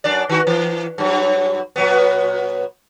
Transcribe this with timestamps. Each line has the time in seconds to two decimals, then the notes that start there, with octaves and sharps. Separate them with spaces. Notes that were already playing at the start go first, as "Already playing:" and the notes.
0.04 F#2 D4 D5
0.29 D#3 F#4
0.47 E3
0.98 G2 F#3
1.76 A#2 F#3 B3